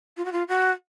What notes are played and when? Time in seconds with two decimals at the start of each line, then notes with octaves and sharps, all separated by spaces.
0.17 F4
0.25 F#4
0.32 F4
0.48 F#4